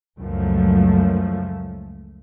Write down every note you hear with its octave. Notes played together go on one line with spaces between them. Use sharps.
C#2 F#2 F3 A3